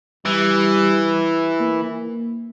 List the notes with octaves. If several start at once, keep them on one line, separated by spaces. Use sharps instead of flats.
E3 G3
A#3